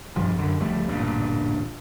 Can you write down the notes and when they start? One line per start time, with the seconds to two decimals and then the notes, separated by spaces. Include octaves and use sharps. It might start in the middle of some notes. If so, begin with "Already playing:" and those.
0.16 B1 G2 F3 G3
0.38 F#2 D3
0.60 C#2 F3 G3 A3
0.88 A1 D2 G2 A#2